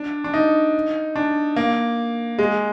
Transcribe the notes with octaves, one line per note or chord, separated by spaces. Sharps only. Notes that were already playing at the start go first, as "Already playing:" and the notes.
Already playing: D4
D4
D#4
D4
A#3
G#3